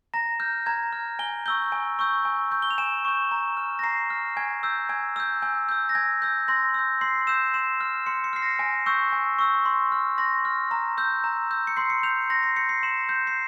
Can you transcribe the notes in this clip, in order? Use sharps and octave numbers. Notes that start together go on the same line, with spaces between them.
A#5 A#6
F6 G6
A#5 G#6
F6
G#5 G7
C#6 E6 G6 G7
G#5
C#6 E6 G6
G#5
C#6 G6
G7
F7
G#5 E7
C#6 G6
A#5
F6
A#6
A#5 C7
F6
G#5 G#6
E6 G6
G#5 G#6
E6 G6
G#5 G6
E6 G6
A#6
G#5 G#6
E6 G6
C6 A#6
E6 G6
C6 C7
E6 G6 E7
C6 E7
F6
C6 C#7
C#7
F6 C7
A#6
G#5 A#6
C#6 E6 G6
G#5
C#6 E6 G6
C6
F6
C6 A#6
F6
A#5
E6 G6
A#5
E6 G6
C#7
C6 C7
C#7
G6 F7
C6 A#6
C7
G6 C#7
C7
C6 E7
G6
C7